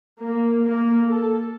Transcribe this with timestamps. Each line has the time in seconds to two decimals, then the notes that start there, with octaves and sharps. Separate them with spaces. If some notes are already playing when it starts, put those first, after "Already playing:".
0.21 A#3
0.65 A#3
1.08 A4